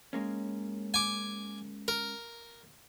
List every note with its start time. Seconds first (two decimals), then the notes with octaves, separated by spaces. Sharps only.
0.13 G#3 A#3 C#4
0.94 G#5 D6
1.88 A#4